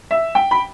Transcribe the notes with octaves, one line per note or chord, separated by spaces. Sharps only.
E5
G5
B5